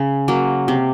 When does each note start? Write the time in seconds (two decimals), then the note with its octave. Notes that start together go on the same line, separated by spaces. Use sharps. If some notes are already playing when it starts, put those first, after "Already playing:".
Already playing: C#3
0.28 F#3 A#3
0.68 C3